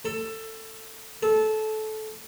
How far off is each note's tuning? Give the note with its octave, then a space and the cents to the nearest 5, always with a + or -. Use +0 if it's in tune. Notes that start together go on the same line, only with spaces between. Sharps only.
A4 +15
A4 -20